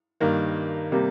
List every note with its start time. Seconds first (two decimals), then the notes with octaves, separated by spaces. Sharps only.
0.20 G2 D#3 A#3
0.92 C3 G3 A#3